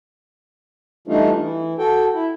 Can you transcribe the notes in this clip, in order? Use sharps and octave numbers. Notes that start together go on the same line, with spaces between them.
E3 G3 A3 D4 D#4 F4
E3
F#4 A4 G5
E4